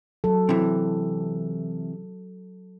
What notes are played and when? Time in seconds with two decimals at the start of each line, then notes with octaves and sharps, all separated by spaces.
0.24 F#3 A4
0.49 C3 E3